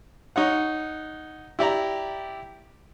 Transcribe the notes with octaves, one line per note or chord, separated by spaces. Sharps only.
D#4 C#5 F#5
E4 G4 D5 A#5